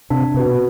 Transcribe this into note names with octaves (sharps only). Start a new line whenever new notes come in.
C3 D4
C3 F#4 B4
B2